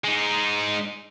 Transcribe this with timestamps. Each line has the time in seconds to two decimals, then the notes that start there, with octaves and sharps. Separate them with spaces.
0.04 G#3 D#4